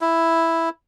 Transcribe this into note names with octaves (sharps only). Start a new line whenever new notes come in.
E4